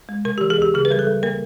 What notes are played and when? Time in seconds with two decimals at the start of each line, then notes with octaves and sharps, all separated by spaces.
0.09 G#3
0.25 C3 A#4
0.38 G4
0.41 E3
0.50 G#4
0.58 D2 G4
0.74 C#3 G#4
0.85 B4
0.91 G3 A#4
0.99 A4
1.07 G3
1.23 A#3 A#4